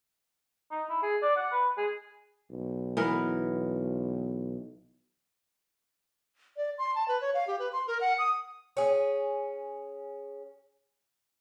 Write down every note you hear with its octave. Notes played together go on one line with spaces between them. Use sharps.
D#4
E4
G#4
D5
F#5
B4
G#4
B1
E3 B3 A#4
D5
C6
A5
B4
C#5
F5
G4
B4
C6
A#4
F#5
D#6
C#4 G#4